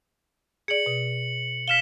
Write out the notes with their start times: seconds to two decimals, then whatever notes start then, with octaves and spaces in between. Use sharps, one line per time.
0.68 G#4 D5 C#7 F#7
0.86 B2
1.68 F5 F6 B6 E7 G7